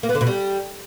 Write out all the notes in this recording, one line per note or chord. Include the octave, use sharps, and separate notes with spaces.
A#3
B3
D3
B2
G3